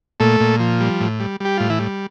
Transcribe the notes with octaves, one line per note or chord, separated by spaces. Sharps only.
A#2 A3 A4
A#2
F3
G3
A2
G3
G3 G4
A2 F4
E3 E4
G3